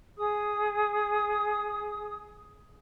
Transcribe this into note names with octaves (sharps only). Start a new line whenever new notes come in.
G#4 D#6